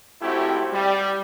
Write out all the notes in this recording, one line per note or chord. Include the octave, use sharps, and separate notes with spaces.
G#1 A3 C4 E4 F#4 G4
G3